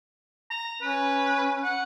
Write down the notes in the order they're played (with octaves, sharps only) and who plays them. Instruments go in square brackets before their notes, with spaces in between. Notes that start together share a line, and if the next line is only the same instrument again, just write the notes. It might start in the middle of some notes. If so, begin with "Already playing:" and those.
[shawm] A#5
[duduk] C#4 [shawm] B4
[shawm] F#5